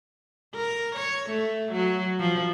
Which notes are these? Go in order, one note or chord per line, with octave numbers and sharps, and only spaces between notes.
A#4
C#5
A3
F#3
F3